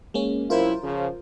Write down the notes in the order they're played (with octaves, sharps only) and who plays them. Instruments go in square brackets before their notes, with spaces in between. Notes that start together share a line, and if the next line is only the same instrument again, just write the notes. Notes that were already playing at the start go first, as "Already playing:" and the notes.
[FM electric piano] G#3 A#3 C#4
[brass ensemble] F#2 C3 E4 [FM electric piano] F4 A#4 C5
[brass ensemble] C#3 F3